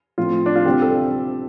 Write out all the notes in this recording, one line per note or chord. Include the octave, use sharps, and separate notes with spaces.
A2 F3 A3 C4 F4
D4
F4
D2 C3 G3 C4 G4
A4